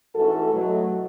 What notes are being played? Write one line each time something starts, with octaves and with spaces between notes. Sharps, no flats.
G#2 E3 A3 C#4 F#4 A4
B2 F#3 A3